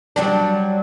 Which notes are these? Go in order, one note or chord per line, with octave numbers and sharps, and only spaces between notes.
F#3 G3 D4